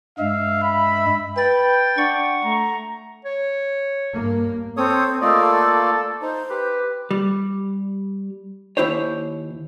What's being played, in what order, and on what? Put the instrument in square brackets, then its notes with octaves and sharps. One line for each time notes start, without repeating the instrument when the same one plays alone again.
[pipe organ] G2 G#3 [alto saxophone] E5 [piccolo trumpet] F5
[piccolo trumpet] B5
[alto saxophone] B4 [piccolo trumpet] G5 [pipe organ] A6
[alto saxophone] D4 [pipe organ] F#5 C#6
[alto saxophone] A3 [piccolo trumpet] A#5
[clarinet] C#5
[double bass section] G2 A#3
[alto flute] C4 [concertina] A4 C#5 D#6
[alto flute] A3 [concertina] A#3 F4 D5 [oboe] D#5
[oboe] A4
[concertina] D#4 [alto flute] C5
[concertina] G4 [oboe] B4
[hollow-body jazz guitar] G3
D#2 E4 C5 C#5